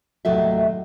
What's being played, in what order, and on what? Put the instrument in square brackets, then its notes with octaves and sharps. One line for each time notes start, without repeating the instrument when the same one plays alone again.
[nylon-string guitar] D#2 A2 C3 F#3 A4 E5